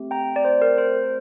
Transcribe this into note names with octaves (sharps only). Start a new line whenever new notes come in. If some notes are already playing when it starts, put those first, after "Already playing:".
Already playing: A3 C4 G4
G5 A#5
D5
C5
A#4
C5